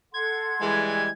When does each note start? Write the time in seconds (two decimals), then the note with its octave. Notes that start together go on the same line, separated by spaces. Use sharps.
0.14 A4 F#5 C6 G#6
0.61 E3 G3 G#3